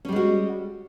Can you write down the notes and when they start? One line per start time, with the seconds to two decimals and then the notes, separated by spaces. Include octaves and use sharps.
0.05 C#4
0.09 G3
0.12 G#3
0.16 F#4